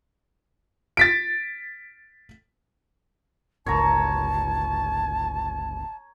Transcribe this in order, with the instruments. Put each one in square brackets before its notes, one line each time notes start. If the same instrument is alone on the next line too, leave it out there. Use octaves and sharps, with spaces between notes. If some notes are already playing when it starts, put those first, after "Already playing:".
[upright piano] A6 B6 D7
[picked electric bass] G1 C#2 [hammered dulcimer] C#5 A#5 [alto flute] A5